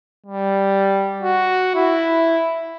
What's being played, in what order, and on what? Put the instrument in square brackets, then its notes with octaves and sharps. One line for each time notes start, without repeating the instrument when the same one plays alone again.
[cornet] G3
F#4
E4